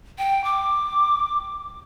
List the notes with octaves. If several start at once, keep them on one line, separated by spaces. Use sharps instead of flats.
G5
D6